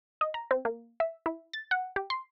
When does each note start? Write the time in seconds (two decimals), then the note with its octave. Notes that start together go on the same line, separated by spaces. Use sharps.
0.21 D#5
0.34 A#5
0.51 C4
0.65 A#3
1.00 E5
1.26 E4
1.53 A6
1.71 F#5
1.96 G4
2.10 C6